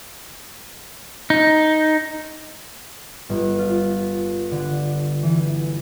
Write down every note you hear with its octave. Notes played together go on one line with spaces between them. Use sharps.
D#4
G1
F4
D3
E3